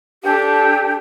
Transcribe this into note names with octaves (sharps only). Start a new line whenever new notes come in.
D4 G4 A4